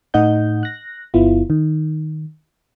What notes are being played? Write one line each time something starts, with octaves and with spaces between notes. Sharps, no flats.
A2 A3 D#4 D#5 F#5 G6
F#6 A#6
G1 B3 E4 F4
D#3